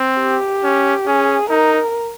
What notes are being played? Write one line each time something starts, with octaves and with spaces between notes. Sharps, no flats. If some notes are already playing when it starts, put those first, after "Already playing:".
Already playing: C4
G4
C#4
C#4 G#4
D#4 A#4